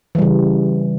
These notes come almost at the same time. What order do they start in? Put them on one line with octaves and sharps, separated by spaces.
E3 G3 C#3